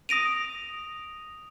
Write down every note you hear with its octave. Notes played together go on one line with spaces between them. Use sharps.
D#6 A#6 D7 D#7 F7